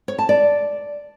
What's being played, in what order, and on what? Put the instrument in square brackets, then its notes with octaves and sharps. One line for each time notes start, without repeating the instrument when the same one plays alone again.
[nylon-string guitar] C#5
A5
D5